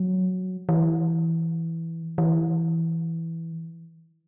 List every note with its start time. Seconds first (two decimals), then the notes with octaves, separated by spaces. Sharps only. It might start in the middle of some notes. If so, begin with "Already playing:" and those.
Already playing: F#3
0.69 E3
2.18 E3